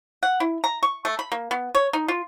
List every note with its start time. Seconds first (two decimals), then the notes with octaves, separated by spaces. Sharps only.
0.23 F#5
0.40 E4
0.64 A#5
0.83 C#6
1.05 A3
1.19 B5
1.32 A#3
1.51 B3
1.75 C#5
1.93 D#4
2.08 F4